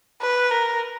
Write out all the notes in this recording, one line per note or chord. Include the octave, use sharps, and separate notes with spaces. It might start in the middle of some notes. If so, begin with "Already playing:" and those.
B4
A#4